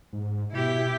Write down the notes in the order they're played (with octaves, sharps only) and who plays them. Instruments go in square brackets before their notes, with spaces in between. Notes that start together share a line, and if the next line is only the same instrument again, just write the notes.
[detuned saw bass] G#2
[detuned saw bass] B2 [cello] E4 G4